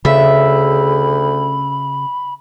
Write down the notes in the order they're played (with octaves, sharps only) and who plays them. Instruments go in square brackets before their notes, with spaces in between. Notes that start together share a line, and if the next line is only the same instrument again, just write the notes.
[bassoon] D2 [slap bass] C#3 [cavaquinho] E5 [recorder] B5